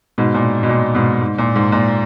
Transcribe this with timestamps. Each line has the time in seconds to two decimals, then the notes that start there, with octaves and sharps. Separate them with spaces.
0.18 G#2 B2
0.34 A#2
0.63 B2
0.69 A#2
0.95 G#2 B2
1.21 G#2
1.38 A#2
1.56 G#2
1.72 A#2